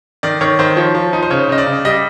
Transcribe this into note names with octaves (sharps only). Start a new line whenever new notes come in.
D#3 D5
D#3 C#5
D#3 C5
F3 C#5
F3
D#4
C5
C#3 C#5
C#3 D#5
D5
C#3
G3 D#5